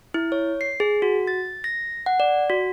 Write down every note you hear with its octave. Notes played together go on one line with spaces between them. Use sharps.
E4
C#5
C7
G#4
F#4
A6
A#6
F#5
D5
F#4